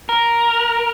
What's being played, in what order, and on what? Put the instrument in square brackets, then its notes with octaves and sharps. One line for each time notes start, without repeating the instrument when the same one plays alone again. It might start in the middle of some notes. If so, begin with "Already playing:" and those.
[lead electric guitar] A#4